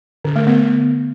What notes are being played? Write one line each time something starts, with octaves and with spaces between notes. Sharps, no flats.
D3
A3
B3